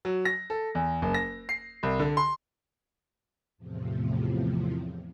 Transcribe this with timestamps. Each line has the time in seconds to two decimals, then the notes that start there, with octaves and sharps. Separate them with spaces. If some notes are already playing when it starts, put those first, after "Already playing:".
0.05 F#3
0.25 A#6
0.50 A4
0.75 E2
1.02 F#1
1.14 A#6
1.49 C7
1.83 C2
1.99 D3
2.17 C6
3.58 E2 A2 C3 F3